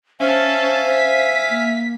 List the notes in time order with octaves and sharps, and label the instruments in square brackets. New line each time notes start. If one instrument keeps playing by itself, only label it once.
[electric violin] C#4 A5 [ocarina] C5 [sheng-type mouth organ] E5 F5 G#5
[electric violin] B6
[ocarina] A#3